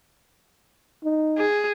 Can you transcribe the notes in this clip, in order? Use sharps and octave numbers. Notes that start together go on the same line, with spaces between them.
D#4
G#4